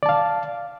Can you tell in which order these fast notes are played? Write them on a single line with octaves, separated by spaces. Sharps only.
D5 A5 F5